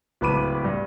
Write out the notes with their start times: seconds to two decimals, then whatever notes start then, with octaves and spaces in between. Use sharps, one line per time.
0.21 D1 C#2 B4 B5 D6 D#7
0.64 G2